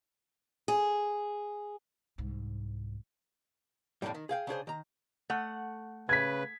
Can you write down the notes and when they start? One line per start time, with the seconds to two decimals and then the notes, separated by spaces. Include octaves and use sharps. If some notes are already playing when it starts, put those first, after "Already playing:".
0.68 G#4
2.18 C2 G#2
4.02 F2 A2 D3 D#3 F3 G3
4.14 D#3
4.29 G#4 F5 G5
4.47 C#3 D4 G#4 C5
4.67 D#3 A#5
5.30 A3 F#5
6.09 C#3 B4 G#6 B6